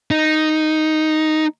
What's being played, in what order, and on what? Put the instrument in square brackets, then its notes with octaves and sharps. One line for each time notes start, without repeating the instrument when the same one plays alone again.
[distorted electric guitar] D#4